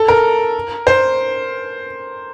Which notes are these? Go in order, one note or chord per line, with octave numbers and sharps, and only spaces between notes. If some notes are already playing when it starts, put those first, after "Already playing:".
Already playing: A4
A#4
C5